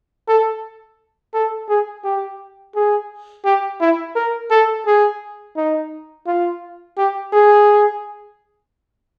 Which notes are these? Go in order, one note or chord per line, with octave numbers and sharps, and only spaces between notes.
A4
A4
G#4
G4
G#4
G4
E4
A#4
A4
G#4
D#4
F4
G4
G#4